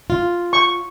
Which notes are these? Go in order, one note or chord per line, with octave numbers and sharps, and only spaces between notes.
F4
C#6